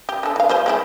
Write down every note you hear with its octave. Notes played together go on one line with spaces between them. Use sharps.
G4
D4 A4
E3 F5
G3 F4 C5
G#3 C4 E4